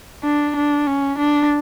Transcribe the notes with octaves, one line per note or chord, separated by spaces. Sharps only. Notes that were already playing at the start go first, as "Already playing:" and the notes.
D4
D4
C#4
D4